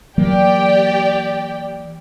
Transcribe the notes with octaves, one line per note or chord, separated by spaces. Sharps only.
E3 F#3 A#3 G4 D5 G5